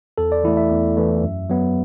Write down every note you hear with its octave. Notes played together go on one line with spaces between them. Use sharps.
E2 A4
D5
E3 A3 E4
E5
E2
E3 A3
F#2
F#3 B3